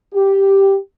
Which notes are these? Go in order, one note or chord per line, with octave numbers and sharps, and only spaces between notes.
G4